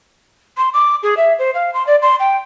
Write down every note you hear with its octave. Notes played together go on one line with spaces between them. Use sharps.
C6
D6
G#4
E5
C5
F5
C6
D5
C6
G5